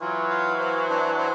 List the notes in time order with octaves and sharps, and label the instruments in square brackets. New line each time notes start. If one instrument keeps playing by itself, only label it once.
[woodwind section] E3 F#3 [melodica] F4
[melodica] F5
C5
D4
C5